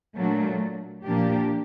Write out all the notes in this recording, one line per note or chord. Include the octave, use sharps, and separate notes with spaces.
A#2 F#3 A3 D4
A#2 F3 A#3 D4 G4